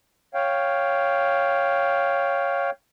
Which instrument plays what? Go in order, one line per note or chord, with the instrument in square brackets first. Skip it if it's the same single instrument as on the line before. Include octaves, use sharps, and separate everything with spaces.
[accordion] C#5 F5 G5